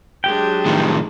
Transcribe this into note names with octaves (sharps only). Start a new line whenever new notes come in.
F#3 G#3 D4 G4 G5
A2 D#3 F3